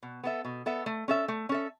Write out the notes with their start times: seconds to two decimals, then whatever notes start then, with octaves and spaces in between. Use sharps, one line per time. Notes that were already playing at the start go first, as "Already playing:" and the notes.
0.03 B2
0.24 B3 A4 E5
0.45 B2
0.66 B3 A4 E5
0.86 A3
1.08 C#4 A4 E5
1.28 A3
1.49 C#4 A4 E5